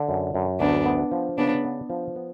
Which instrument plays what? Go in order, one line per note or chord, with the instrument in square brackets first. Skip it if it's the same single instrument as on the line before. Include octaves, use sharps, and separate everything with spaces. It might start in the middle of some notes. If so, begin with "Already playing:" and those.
Already playing: [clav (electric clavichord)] D3
F#2
F#2
[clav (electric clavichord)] D2 [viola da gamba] B3 D4
[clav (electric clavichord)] B3
F3
[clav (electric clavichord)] C#3 [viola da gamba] B3 D4
[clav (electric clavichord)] B3
F3
B3